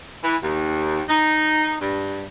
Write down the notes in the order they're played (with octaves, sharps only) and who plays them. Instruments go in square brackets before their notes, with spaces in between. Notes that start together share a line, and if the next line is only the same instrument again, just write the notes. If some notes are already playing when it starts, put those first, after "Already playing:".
[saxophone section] E3
D#2
D#4
G2